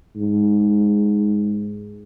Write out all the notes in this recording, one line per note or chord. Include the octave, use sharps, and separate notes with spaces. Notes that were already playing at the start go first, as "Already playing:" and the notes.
G#2